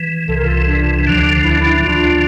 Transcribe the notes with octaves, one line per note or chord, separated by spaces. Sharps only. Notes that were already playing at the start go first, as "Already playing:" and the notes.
Already playing: E3
C2 C3 E3 A4
A#4
F4 A4
D4 F4
D2 D3 F3 D4
E4
D4
E4
D2 D3 F3 D4 F4